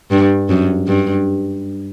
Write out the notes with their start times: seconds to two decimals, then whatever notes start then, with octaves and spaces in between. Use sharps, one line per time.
0.11 G2
0.49 F#2
0.87 G2